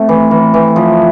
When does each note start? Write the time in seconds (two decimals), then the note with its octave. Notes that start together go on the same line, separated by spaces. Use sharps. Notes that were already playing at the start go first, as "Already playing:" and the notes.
Already playing: A3 C4
0.09 E3
0.31 E3
0.54 E3
0.76 F3